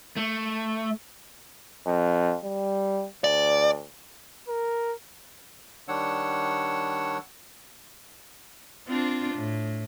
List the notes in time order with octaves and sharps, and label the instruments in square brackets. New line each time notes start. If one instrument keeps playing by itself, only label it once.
[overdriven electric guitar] A3
[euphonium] F2
G3
[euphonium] D2 [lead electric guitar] D5
[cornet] A#4
[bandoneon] D#3 G3 D4 C#5 F#5 E6
[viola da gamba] C4 D4 F4
A2